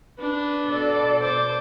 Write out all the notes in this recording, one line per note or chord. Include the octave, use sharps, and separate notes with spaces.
D4 B4
B2 A4 D5
C5 D6